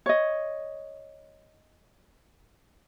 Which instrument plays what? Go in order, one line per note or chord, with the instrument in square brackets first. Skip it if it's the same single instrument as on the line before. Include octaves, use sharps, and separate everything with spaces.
[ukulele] C#5 D#5